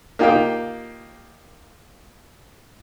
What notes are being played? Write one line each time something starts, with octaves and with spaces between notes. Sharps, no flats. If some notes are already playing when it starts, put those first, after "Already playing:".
A#3 D#4 F4 G4 F5 G5